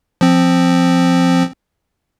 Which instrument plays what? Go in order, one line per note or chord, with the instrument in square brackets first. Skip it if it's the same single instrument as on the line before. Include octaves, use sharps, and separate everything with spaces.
[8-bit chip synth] F3 C4